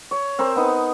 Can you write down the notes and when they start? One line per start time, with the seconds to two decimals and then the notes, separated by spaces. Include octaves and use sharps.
0.11 C#5
0.39 C4 A#4 C5
0.56 B3 D#4